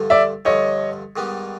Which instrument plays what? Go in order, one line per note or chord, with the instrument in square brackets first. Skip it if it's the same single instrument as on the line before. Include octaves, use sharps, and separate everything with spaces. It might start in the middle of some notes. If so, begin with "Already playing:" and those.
Already playing: [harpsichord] G2 D3 F3 A3
[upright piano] D5 E5
[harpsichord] G2 D3 F3 A3 [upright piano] C#5 D#5
[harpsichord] G#2 D#3 G3 B3